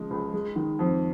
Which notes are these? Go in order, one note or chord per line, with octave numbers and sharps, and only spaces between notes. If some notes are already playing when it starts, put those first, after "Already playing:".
Already playing: C#3 F3 G#3
C#2
G#3
D#3
F2